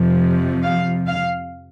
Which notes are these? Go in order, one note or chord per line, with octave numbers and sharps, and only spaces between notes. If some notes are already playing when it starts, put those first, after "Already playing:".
Already playing: F2 C3 F3
F5
F5